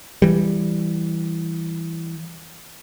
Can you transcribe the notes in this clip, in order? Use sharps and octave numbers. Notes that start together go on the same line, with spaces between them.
E3 G3